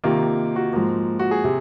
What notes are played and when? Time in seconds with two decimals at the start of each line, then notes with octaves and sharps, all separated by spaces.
0.04 C3 D#3 A#3 F4
0.56 F#4
0.73 G#2 F3 A#3
1.19 F#4
1.31 G#4
1.44 C3